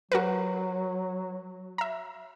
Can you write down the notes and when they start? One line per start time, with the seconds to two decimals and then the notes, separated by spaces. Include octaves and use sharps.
0.12 F#3 F#4 A#4 B4
1.78 E5 A#5